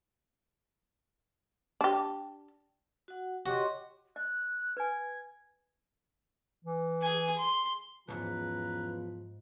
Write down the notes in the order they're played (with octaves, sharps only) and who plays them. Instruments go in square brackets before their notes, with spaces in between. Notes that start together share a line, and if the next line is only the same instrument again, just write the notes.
[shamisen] D4 G4
[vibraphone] F#4 F#5
[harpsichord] F#4 [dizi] G4 [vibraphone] C#5 D#5 C6
[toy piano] D#5 [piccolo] F#6
[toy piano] B4 G#5 [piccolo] G#6
[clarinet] E3
[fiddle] G#4 G#5
C6
[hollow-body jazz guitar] B1 G#2 [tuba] E2 [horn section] C#3 B4 A#5 [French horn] F3